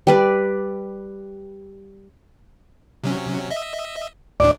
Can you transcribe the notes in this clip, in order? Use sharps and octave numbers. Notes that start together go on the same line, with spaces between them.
G3 B4 D5
C3 F#3 C#4
D#5 E5
D2 A2 D4 D5